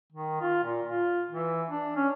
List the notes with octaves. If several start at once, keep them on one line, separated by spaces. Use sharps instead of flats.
D#3
F4
A#2
F4
E3
D4
C#4